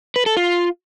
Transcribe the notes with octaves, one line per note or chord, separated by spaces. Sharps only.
B4
A4
F4